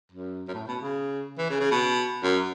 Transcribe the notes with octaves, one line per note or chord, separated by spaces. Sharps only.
F#2
F#2
A2
B2
C#3
E3
C#3
C#3
B2
F#2